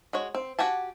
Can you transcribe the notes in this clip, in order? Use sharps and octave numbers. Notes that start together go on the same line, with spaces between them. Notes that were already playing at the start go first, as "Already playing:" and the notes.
G#3 F#4 C#5
C4
F#4 G4 F#5 G#5 A5